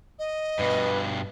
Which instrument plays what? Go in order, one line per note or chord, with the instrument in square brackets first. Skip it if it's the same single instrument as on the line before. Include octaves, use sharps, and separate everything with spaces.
[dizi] D#5
[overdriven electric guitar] G2 B2 [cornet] B4